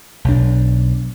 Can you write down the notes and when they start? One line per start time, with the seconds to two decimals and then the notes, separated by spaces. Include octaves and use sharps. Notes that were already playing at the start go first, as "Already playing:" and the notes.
0.24 B1 D4